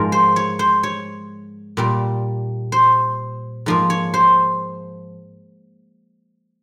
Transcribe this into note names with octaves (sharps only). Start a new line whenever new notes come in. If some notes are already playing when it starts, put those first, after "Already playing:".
Already playing: G#2 F3 G#3 A#4
C5
C#5
C5
C#5
A#2 G3 A#3
C5
G#2 F3 A#3
C#5
C5